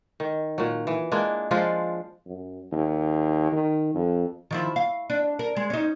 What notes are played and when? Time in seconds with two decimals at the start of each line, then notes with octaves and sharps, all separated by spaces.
0.20 D#3
0.58 A#2 F#3
0.87 E3
1.12 G#3 A#3 D4
1.51 F3 G#3 D4 F4
2.26 F#2
2.72 D#2
3.52 D#3
3.95 F2
4.51 D#3 F3 E4
4.76 F5
5.10 D4
5.39 A#4
5.57 G#3
5.70 C#4 D#4